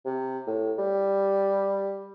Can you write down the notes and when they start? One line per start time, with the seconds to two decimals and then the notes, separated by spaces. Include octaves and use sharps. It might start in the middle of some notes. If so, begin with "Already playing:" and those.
0.06 C3
0.47 A2
0.78 G3